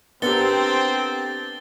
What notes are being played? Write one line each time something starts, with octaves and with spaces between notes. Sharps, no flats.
B3 C4 D4 G4 A4 A#4 A6 G7